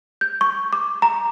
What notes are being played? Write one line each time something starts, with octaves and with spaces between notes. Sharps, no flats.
G6
C#6
D6
A#5